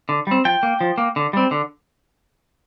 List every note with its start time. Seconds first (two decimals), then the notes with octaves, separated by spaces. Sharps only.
0.09 D3
0.27 G3 C4
0.45 F3 G5
0.63 A#3
0.81 F3
0.98 A#3
1.16 D3
1.33 G3 C4
1.51 D3